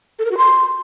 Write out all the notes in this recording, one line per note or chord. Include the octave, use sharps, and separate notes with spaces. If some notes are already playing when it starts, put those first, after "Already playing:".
A4
A#4
F#4
C6